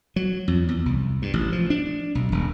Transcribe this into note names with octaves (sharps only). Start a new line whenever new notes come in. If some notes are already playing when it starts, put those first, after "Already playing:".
F#3
F2
E2
C2
G2
A1
F3
D4
B1
D#1